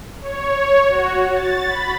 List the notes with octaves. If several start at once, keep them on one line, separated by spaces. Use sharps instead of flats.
C#5
C#5
F#4
A6
B5